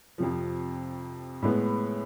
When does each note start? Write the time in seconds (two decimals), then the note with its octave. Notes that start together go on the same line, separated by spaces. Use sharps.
0.18 F2 C3 F3
1.42 A2 G#3 B3